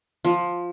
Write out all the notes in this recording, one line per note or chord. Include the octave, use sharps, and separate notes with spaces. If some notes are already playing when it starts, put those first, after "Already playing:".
F3